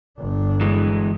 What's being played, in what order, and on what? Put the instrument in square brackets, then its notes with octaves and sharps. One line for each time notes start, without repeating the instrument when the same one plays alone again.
[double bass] G1 D4
[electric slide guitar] E3 G#3